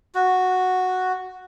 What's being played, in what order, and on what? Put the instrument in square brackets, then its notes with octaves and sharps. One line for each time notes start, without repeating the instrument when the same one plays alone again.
[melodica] F#4